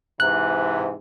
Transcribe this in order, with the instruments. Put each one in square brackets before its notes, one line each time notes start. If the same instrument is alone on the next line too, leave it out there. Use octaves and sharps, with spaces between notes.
[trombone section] G#2 C3 E3 [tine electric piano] F#6